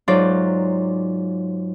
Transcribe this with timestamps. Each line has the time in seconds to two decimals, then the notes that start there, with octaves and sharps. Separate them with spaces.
0.08 G#2 F#3 D#4 F4 D5